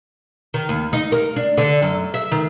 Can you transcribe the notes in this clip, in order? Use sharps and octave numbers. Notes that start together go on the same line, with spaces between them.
D#3
D#2
D#4
A#4
D4
D3
F#2
E5
D#3